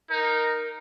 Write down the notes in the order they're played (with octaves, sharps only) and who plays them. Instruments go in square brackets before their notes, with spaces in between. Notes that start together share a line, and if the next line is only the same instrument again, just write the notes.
[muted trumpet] D#4 [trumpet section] A#4